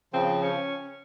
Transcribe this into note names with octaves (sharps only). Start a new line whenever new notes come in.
C#3 F3 C4
C#4